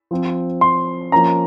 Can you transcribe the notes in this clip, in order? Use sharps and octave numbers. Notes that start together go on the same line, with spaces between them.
F3 C4
C6
F3 A#3 C#4 A#5